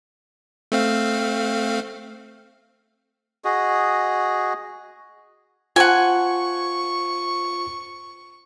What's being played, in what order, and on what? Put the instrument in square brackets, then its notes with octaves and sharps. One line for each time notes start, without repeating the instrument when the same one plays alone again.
[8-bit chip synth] A3 C4 F5
[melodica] F#4 G#4 D#5
[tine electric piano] F4 C5 A5 [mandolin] F#5 G#5 [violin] C#6